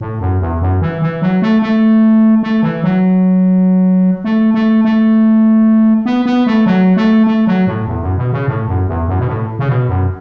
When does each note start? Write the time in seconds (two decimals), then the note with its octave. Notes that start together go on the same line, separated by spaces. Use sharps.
0.01 A2
0.21 F#2
0.41 E2
0.62 F#2
0.81 E3
1.02 E3
1.22 F#3
1.42 A3
1.62 A3
2.43 A3
2.63 E3
2.84 F#3
4.24 A3
4.54 A3
4.85 A3
6.06 B3
6.26 B3
6.47 A3
6.66 F#3
6.97 A3
7.27 A3
7.47 F#3
7.67 A2
7.87 E2
8.02 F#2
8.18 B2
8.33 C#3
8.48 A2
8.68 F#2
8.88 E2
9.08 F#2
9.19 B2
9.28 A2
9.59 C#3
9.69 B2
9.89 F#2